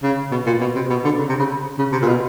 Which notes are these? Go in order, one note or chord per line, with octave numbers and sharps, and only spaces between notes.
C#3
B2
A#2
B2
C3
B2
D3
C#3
C3
C#3
C#3
C3
A#2
B2